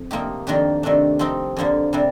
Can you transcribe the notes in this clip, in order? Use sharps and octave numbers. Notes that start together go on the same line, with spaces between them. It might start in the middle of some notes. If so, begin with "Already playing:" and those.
Already playing: F2
C3 F3 A#3 D#4 G4
F2 D#3 A#3 D4 G4
C3 D#3 A3 D4
F3 C4 D#4 G4
F2 D3 F3 A#3
C3 G3 D4